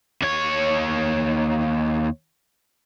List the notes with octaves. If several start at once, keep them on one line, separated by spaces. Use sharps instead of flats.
D#2 C#5